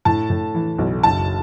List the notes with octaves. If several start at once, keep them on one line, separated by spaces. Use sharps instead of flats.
A2 A5
A2
E3
B1
F#1 A5